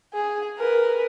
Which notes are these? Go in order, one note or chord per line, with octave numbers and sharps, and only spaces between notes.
G#4
A#4 B4